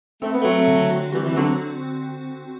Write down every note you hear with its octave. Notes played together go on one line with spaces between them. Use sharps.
A3 C4
B3
F#3 A3 C4
D3
F#4
E3 G3 F#4
E3
D3 F#3 C4